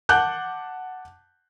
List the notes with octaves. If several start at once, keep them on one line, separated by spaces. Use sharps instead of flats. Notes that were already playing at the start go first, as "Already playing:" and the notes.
F#5 A5 D6 F#6 G6